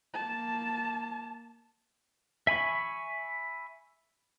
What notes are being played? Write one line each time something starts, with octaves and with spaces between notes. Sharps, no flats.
A#3 A5
E5 G#5 B5 C#6